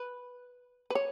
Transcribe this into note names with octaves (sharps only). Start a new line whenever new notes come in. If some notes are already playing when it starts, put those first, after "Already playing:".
Already playing: B4
B4
C#5